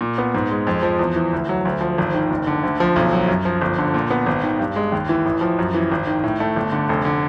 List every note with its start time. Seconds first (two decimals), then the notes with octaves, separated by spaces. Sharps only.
0.01 A#2
0.18 B3
0.35 G#2
0.51 G#3
0.67 F2
0.83 F3
0.99 E2
1.16 E3
1.33 D2
1.49 F#3
1.65 D2
1.81 F3
1.98 G#1
2.14 D#3
2.31 F#1
2.47 D3
2.63 D2
2.80 F3
2.96 B1
3.13 F#3
3.28 F#2
3.45 F3
3.62 G1
3.78 D3
3.94 A#2
4.10 B3
4.26 G#1
4.43 D#3
4.60 G2
4.76 G#3
4.92 D#2
5.09 E3
5.26 A1
5.41 F3
5.59 F#2
5.74 E3
5.91 G#1
6.07 D#3
6.24 A2
6.40 A3
6.56 G1
6.72 D3
6.89 F1
7.05 D3